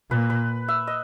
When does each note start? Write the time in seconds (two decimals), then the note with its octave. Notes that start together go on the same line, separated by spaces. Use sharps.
0.11 A#2 B4
0.30 B4
0.68 E5
0.87 D#5